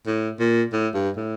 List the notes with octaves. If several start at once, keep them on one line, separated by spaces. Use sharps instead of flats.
A2
A#2
A2
G2
A2